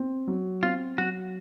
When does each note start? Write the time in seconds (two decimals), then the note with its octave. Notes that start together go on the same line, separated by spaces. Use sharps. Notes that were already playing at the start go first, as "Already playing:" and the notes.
Already playing: C4
0.28 F#3
0.63 C4 F4
0.98 F#3 F#4